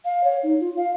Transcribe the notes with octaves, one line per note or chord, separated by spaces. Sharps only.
F5
C#5
D#4
F4
F5